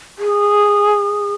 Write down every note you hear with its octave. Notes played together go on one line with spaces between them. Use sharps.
G#4